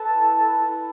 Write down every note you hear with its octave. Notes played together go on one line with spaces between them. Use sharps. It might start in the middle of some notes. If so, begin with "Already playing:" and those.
Already playing: A4 B4 A5
E4
B4
E4